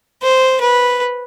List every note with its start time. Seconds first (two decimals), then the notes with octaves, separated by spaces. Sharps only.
0.22 C5
0.61 B4